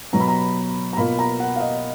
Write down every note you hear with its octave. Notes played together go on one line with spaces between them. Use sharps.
B2 F#3 B3 A#5
B5
A#5
A#5
B2 A#3 F4 B5
A#5
F#5
F5
D#5